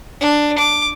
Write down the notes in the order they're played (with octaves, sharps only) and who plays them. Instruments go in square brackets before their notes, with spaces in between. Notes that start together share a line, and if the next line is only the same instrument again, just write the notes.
[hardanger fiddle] D4
D6